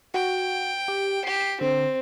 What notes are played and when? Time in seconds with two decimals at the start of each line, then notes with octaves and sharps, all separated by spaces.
0.14 F#4 G5
0.88 G4
1.25 G4 C7
1.61 D3 C4